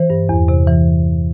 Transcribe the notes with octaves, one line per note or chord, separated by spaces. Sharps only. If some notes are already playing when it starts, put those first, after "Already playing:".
Already playing: E3 C5
G2
E2
C3
E3